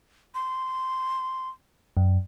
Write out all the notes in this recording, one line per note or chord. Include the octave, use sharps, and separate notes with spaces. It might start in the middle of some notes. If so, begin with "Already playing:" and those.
C6
F#2